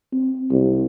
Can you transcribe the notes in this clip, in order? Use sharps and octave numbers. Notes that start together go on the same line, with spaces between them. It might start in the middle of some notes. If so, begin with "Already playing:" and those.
C4
C2